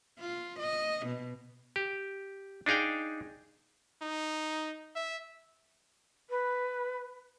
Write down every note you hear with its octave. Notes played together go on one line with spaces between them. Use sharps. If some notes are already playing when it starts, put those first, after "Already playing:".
F4
D#5
B2
G4
D4 D#4 G#4 F5 G5
D#4
E5
B4